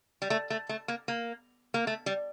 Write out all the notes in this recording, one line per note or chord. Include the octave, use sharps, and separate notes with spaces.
G3
A3
A3
A3
A#3
A#3
A#3
A3
G3